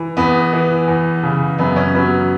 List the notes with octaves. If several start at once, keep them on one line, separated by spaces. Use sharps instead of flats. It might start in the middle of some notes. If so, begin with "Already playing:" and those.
Already playing: E3
E2 B3
E3
E2
C#3
F#2 B3
C#4
F#3 B3